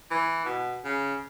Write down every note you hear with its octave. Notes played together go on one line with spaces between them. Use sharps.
E3
B2
C#3